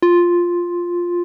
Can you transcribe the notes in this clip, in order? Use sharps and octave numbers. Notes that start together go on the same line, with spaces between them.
F4